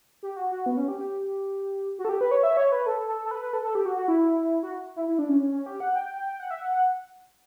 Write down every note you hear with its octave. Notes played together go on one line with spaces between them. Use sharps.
G4
F#4
F#4
B3
C#4
G4
G4
F#4
A4
G4
B4
C#5
E5
C#5
B4
A4
A4
A4
B4
B4
A4
A4
G4
F#4
F#4
E4
F#4
E4
E4
D4
C#4
C#4
C#4
G4
F#5
G5
G5
F#5
E5
F#5
F#5